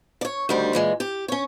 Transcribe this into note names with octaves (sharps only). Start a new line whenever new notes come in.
C#5 D5
D2 D#3 G3 C5
A#2 E3 G#3
G4
C#4 C#5